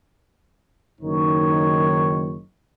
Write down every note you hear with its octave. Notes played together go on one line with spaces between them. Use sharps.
F#1 D#3 D#4 C#5